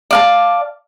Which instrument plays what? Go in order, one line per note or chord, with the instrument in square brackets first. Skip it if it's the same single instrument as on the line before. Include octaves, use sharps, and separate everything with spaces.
[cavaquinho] D5 F5 A5